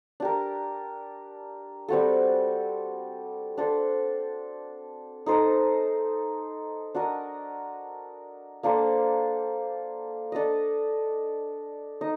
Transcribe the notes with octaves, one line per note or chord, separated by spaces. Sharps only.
D4 G4 A#4
G3 C4 F#4 A4
D4 A4 C5
D#4 A4 C5 D#5
D4 F#4 A#4 D#5
A#3 D4 A4 C5
D4 A4 D#5
D#4 D#5